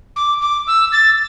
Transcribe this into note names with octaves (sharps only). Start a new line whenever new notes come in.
D6
D6
E6
A6